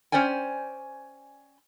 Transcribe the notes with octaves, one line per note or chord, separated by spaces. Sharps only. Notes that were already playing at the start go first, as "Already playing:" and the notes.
C#4 C5 D5 G5 G#5